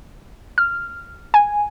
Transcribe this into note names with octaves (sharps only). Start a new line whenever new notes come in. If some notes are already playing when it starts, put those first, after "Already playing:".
F6
G#5